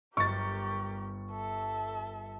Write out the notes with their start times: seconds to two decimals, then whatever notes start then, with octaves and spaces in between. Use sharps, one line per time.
0.17 G1 G4 A#4 C#6 A6
1.32 A4 E5